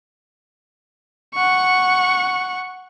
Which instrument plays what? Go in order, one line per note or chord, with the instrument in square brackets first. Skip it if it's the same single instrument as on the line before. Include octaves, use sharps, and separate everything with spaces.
[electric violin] F#5 C#6